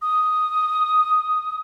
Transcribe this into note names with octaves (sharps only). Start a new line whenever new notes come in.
D#6